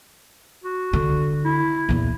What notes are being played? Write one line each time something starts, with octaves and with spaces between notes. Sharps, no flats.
F#4
D3
E4
E2 A#2